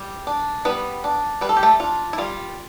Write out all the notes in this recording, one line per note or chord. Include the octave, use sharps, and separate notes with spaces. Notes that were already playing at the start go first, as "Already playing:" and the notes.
Already playing: G3
D4
G3 B3 B4
D4
G3 B4
A4
G4
A3 A4
D4 F4
E4
G3 F4